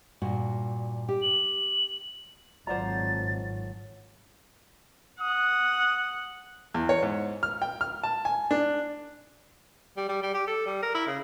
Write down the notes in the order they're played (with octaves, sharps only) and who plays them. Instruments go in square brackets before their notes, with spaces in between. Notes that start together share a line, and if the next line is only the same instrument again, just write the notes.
[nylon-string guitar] G2 A#2 F#4
G4
[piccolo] F#7
[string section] G#1 [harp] F#3 F4 F#4 [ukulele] C5 D5 A#5 [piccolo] A6
[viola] F#5 [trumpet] D#6
[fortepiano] E2
C#5
G#2
F6
G5
F6
A5
G#5
D4
[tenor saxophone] G3
G3
G3
G4
A4
G3
A#4
E4
C#3